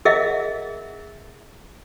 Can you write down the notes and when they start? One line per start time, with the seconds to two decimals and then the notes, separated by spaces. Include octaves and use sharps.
0.05 G#4 A#4 D#5 E5 F#5